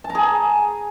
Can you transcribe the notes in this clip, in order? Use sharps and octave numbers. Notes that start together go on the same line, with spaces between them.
A5
A#5
G#4